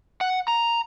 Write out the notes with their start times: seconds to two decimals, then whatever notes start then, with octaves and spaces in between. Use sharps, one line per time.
0.21 F#5
0.48 A#5